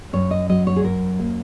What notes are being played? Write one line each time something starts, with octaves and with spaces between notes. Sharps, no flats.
F#2 C#5
D#5
F#3 D#5
C#5
G#4
F#2 A#4
A#3